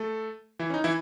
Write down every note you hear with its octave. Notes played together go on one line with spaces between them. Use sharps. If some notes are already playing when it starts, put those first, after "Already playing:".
Already playing: A3 A4
E3 E4
C#4
D#4
E3 E4